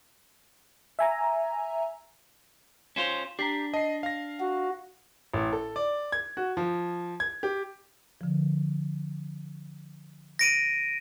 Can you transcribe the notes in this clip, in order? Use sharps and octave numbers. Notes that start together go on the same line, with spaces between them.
E5 G#5 A#5
C#4 F4 C5 E7 F7
D4 G4 A#5 B6 C7
D#5 A5 C7
F5 A#6
F#4
A1
A4
D5
G#6
F#4
F3
G#6
G4
D3 F3
A#6 D7 D#7